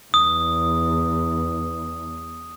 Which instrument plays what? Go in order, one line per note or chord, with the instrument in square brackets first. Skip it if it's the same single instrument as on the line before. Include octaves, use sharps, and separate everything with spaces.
[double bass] E2 [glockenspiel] D#6